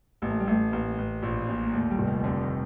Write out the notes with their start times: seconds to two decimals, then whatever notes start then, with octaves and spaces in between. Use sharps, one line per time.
0.22 A1 A#3
0.30 A3
0.40 G3
0.47 A1 A3
0.72 A1 A#3
0.98 A1
1.23 A#1
1.49 A#2
1.66 A#3
1.73 D#2 A3
1.91 G3
1.99 F1
2.07 D#3
2.24 F2 D3
2.41 D#3